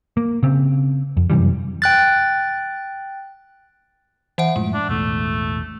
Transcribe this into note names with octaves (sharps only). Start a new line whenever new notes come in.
A#3
C#3 C4
F2
F#2 C3 E3 G3
G5 F#6 A6
E3 E5 F#5
F#2 A2 F3 G#3
D4
E1 A1 A2 A3